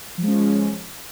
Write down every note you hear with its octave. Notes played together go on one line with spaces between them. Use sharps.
F3 G#3 C#4